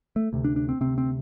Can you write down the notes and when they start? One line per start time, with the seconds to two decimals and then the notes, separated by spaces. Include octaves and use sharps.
0.16 A3
0.33 D2 C3
0.44 D4
0.56 D4
0.69 C4
0.81 D2 C3 C4
0.98 C4